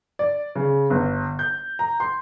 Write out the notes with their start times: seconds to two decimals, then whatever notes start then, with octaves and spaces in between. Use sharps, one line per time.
0.19 D5
0.55 C#3
0.90 G1
1.39 G6
1.79 A#5
2.00 C6